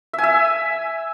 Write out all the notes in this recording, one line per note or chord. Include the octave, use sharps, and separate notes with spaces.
E5
G#5
E5